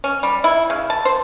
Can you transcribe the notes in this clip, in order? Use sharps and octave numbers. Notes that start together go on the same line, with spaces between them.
C#4
G3
E4
C#3
A5
C5